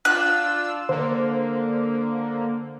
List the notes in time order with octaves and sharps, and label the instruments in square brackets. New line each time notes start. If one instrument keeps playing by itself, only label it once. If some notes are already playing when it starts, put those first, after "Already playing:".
[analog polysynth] D4 F4 E6 [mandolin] F#6
[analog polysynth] D3 A#3 [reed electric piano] C5